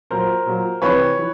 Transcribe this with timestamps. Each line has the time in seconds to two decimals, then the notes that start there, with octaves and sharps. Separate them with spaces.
0.10 A#2 F#3 A#4 C5
0.46 A#2 F#3
0.82 C3 E3 B4 C#5
1.17 E3